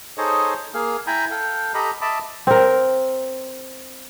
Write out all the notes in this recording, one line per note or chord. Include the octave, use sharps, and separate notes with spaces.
D#4 G#4 A4 C5 C#5 D#5
A#3 G#4 F5
E4 G5 G#5 A#5 B5
A4 F5 G5
G4 A4 D#5 A#5 B5
D#5 E5 A5 B5 D6
C4 A#4